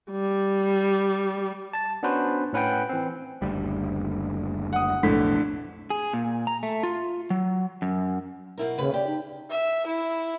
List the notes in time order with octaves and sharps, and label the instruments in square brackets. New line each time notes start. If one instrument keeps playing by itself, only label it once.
[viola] G3
[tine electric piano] A5 A6
B3 C#4 D4 F#4 B4 C5
A2 C#4 B4 F#5 G5
E3 C4
[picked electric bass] F#1 D2 G3
[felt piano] F#5 D#6
[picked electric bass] B1 F2 [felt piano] A2 D3 B6
[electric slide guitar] G#4
A#2
A#5
A3
F4
F#3
F#2
[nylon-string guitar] B2 E4 A#4
[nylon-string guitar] D#2 B4 [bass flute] C#3
[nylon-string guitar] G4 [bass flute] D5
[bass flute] D#4
[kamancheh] E5
E4